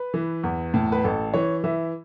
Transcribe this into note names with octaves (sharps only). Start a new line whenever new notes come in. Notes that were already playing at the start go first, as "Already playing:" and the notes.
Already playing: B4
E3
E2
A2
B4
A1 A4
E3 C#5
E3 E5